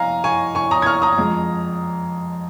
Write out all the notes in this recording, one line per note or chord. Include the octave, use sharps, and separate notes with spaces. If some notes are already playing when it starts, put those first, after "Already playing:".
Already playing: F2 D#5 F5 G#5 A#5
G#5 C#6
G#5 C#6
A#5 D#6
G#6
C#6 F6
A#5 D#6
F2 F3 G#3